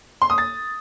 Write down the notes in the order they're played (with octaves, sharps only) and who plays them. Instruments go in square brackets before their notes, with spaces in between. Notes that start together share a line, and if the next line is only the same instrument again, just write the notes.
[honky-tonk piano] C6
D#6
A6